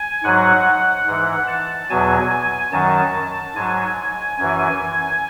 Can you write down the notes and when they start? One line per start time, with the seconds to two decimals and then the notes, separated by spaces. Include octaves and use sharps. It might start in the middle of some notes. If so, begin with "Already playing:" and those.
Already playing: G#5
0.23 G#2 F#3 F#5
1.07 G#2 E3
1.48 A5
1.90 E2 B2 F#3 G#5
2.30 G#5
2.72 F#2 D#3 F#3 A5
3.55 G#2 F#3 G#5
4.39 F#2 E3 G#5